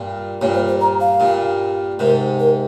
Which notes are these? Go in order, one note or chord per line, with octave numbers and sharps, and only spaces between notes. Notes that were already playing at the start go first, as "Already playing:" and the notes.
Already playing: G2 A#2
G2 A#2 C#5
C5
C5
A#5
F5
G2 A#2
G#2 C3 A#4
A#4